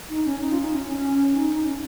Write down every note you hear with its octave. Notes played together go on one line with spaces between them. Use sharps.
D#4
C#4
D#4
F4
D#4
C#4
C#4
D#4
D#4
C#4